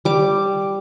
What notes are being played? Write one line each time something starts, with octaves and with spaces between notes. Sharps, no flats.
G3 D6